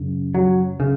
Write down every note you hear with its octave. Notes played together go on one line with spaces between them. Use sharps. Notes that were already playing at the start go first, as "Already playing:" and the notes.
Already playing: F#2 C#3
F#3
C#3